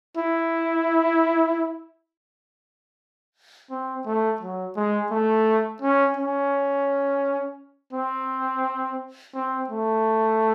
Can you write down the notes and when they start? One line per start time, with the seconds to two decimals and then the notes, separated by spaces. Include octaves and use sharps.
0.17 E4
3.71 C4
4.06 A3
4.41 F#3
4.76 G#3
5.11 A3
5.82 C#4
6.17 C#4
7.93 C4
9.34 C4
9.69 A3